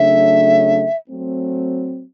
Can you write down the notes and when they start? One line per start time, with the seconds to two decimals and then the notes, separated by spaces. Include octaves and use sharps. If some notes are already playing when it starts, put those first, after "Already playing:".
Already playing: C#3 F#3 A3 D4 E5
1.09 F#3 A3 C4